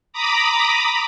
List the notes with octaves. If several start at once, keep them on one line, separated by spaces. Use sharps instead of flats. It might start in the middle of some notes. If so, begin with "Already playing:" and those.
A#5 B5 D6 D#6